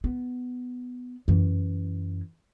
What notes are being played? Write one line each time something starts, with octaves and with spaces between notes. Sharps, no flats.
B3
F#2 E3